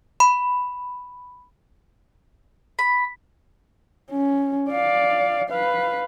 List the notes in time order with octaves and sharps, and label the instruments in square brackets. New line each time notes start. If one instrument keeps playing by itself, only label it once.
[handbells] B5
[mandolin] B5
[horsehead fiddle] C#4
D5 F5
B4 F5